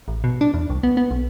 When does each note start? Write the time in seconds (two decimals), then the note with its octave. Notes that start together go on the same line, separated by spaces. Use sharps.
0.08 A1
0.24 B2
0.41 D4
0.54 E2
0.70 C2
0.83 B3
0.97 B3
1.11 B1